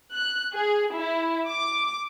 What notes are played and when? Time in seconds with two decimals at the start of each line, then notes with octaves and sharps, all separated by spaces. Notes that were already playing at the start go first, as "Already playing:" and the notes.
0.14 F#6
0.55 G#4
0.97 E4
1.50 D6